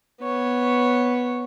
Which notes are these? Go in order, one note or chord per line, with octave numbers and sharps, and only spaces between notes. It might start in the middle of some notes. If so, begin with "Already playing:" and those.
B3 C#5